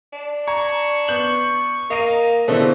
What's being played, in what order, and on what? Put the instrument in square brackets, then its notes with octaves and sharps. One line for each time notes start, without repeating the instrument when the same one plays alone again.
[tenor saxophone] D4
[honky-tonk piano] A#5 [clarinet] C#6 [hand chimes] G#6
[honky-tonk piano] B3 G6 F#7
[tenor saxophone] A#3 [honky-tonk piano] D#5 D#7
[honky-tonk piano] B2 D3 E3 [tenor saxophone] A3 [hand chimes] G#4 C5 C#5